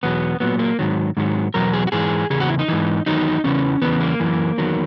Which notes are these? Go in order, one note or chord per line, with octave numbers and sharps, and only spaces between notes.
E2 B2 F#3 B3
A#2 F#3 B3
A#3
G#2 D#3 F#3
G#2 D#3 F#3
E2 B2 F#3 A#4
G#4
F#4
G#2 E3 G#4
E2 C#3 G#4
F#4
E4
D#4
G#2 E3
E2 D#3 F#3 D#4
E2 C#3 E3 C#4
E2 C#3 E3 B3
A#3
F#2 E3
E2 D#3 F#3